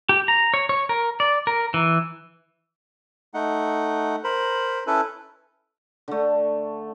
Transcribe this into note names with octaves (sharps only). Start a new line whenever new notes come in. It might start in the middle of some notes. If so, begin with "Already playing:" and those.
G4
A#5
C#5
C#5
A#4
D5
A#4
E3
A3 D#4 F#5
A#4 C5 B5
C#4 E4 A4 B4
D3 A3